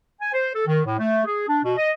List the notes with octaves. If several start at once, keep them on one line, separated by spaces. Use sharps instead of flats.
G#5
C5
A4
D#3
A2
A3
G#4
D4
B2
D#5